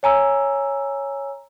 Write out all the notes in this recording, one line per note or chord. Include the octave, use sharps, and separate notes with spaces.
C#5 G#5 A#5 E6